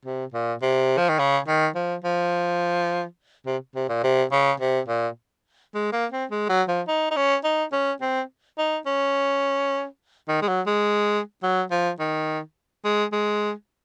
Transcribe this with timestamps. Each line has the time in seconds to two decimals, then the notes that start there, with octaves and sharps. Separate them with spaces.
0.05 C3
0.34 A#2
0.62 C3
0.98 F3
1.09 D#3
1.19 C#3
1.48 D#3
1.75 F3
2.04 F3
3.47 C3
3.76 C3
3.89 A#2
4.04 C3
4.32 C#3
4.60 C3
4.88 A#2
5.75 G#3
5.93 A#3
6.12 C4
6.31 G#3
6.49 F#3
6.69 F3
6.88 D#4
7.11 D#4
7.17 C#4
7.44 D#4
7.73 C#4
8.02 C4
8.58 D#4
8.86 C#4
10.29 D#3
10.42 G#3
10.48 F#3
10.67 G#3
11.43 F#3
11.71 F3
12.00 D#3
12.85 G#3
13.13 G#3